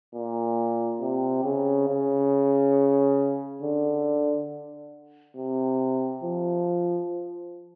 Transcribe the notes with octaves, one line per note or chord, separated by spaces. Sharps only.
A#2
C3
C#3
C#3
D3
C3
F3